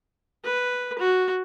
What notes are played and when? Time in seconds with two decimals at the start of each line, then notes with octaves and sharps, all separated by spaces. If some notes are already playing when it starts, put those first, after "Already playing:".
0.44 B4
0.99 F#4